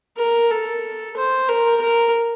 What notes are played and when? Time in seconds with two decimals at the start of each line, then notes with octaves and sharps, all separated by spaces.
0.18 A#4
0.50 A4
1.16 C5
1.49 A#4
1.81 A#4